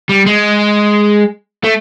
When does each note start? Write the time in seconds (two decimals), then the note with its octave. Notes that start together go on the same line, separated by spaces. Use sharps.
0.09 G3
0.26 G#3
1.64 A3